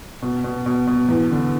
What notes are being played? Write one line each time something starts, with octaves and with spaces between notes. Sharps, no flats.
B2
B2
B2
B2
E2
D3